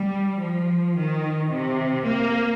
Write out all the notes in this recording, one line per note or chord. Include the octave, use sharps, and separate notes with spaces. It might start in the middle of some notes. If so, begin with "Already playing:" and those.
Already playing: G3
F3
D#3
C3
A#3